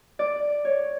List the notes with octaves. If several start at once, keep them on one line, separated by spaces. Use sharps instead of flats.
D5
C#5